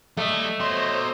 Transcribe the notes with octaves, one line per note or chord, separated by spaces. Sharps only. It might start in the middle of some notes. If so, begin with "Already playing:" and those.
G3 A3 D#5
B2 C5 C#5 D#5 C6